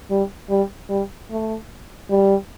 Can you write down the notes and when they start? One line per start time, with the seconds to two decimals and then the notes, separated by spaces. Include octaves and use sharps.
0.10 G3
0.50 G3
0.89 G3
1.31 A3
2.10 G3